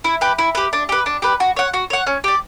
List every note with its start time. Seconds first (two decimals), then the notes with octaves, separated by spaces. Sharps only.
0.04 E4
0.21 G4 B4
0.39 E4
0.55 G4 B4
0.73 D4
0.89 G4 B4
1.06 D4
1.22 G4 B4
1.40 F#4
1.56 C#5 F#5
1.74 F#4
1.90 C#5 F#5
2.07 C#4
2.24 G4 D5